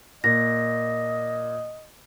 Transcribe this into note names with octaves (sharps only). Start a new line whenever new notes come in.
A#2 D#5 A#6